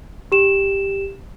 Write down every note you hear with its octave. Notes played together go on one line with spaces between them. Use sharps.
G4 E7